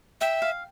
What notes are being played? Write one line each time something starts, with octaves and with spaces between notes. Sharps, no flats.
E5 G5
F5